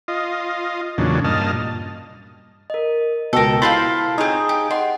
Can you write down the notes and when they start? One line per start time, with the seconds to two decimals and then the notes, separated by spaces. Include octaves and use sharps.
0.08 F4 D#5
0.98 E2 A#2 C#3 F#3 D4
1.24 G2 A#2 D#5 A5 F6
2.70 A#4 D#5
3.33 C#2 B2 A4 A#4 G5 E6
3.62 E4 F4 A4 C5 B5 C6 A6
4.18 C4 D#4 G#4 C#5 D#6
4.49 G4
4.70 D#5 F#5 C6